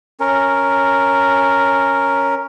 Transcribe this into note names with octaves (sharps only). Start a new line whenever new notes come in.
C#4 A#4